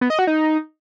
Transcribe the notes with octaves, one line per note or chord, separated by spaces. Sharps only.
B3
D#5
F#4
D#4